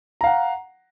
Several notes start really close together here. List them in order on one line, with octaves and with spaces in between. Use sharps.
A#5 F5 F#5